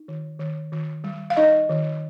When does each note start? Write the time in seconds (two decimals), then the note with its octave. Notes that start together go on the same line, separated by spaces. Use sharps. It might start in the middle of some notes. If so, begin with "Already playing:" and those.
Already playing: D#4
0.08 D#3
0.39 D#3
0.72 D#3
1.04 G3
1.30 F5
1.37 D#4 D#5
1.69 D#3